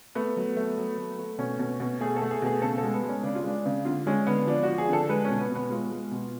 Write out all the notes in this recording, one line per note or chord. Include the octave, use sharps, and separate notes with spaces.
A3 B3
F#3
A3
F#3
A3
A3
B2 C#4
B2
B2
A3 G#4
A4
A3
G#4
B2 G#4
C#3 A4
A4
G#3
B3
G#3
C#4
C#3 D4
F4
G#3 D4
C#3
D3 F4
G#3 C#4
D3 B3
F3 D4
F3 F#4
G#4
D3 A4
G#3 B4
B2 C#4
B3
B2
B3
G#3 F4
G#3
B2